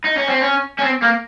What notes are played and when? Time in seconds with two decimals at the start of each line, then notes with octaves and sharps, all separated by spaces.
0.04 D#4
0.17 C#4
0.28 C4
0.41 C#4
0.79 C#4
0.83 C4
1.02 A#3